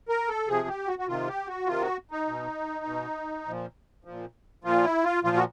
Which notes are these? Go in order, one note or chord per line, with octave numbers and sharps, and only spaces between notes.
A#4
A4
C3 F3 G#4
G4
F#4
F#4
C3 D#3 F4
G4
F#4
C3 D#3 F4
F#4
D#4
B2
B2
A#2 F3
A#2 F3
A#2 F3 F4
E4
F4
A#2 F3 F4
F#4